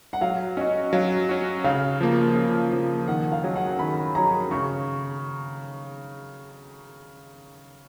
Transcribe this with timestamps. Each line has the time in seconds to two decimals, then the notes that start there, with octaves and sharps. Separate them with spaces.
0.13 F#5
0.21 F#3 F5
0.57 C#4 F#4 D#5
0.93 F#3 F5
1.29 C#4 F#4
1.64 C#3 F5
2.01 F3 A#3
2.36 C#3
2.72 F3 A#3
3.08 D#3 F#5
3.32 F5
3.43 F#3 C#4 G#4
3.56 F#5
3.79 D#3 B5
4.15 F#3 C#4 G#4 A#5
4.51 C#3 C#6